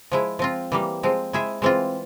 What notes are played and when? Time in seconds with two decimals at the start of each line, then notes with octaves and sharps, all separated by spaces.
0.12 F3 G#3 E4
0.39 F3 C4 F4
0.72 E3 G3 A#3
1.03 F3 G#3 C4
1.33 G#3 E4 G#4 E5
1.62 E3 G#3 C4 F4